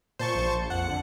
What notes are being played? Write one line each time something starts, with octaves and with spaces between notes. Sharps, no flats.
A#2 C5 A5 C#6
A#1
F2 F#5
D3